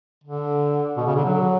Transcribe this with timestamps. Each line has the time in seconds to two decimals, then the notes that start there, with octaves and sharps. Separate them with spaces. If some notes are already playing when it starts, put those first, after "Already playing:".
0.24 D3
0.97 B2
1.06 C#3
1.15 D3
1.25 F#3